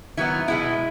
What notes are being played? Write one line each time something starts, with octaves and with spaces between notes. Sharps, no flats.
D#3 F#3 B3 E4
B2 G#3 B3 E4